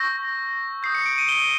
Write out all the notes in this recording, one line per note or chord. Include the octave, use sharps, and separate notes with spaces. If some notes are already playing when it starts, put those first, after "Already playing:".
Already playing: C#6 E6 G6 A#6
D#6 G6 C7
C#7
D7
D#7
G7